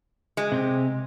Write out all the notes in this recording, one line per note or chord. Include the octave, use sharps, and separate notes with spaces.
G#3
C3 C4 G4